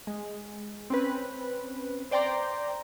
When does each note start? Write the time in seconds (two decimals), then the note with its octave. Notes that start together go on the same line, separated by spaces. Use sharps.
0.07 G#3
0.90 C4 C#4 B4
2.11 C5 D5 G5 A#5 C6